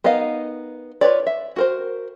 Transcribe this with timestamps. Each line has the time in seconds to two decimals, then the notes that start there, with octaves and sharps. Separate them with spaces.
0.04 B3 D#4 A#4 D#5 F5
1.01 F4 B4 C#5 D5
1.27 E5
1.56 F#4 A#4 C5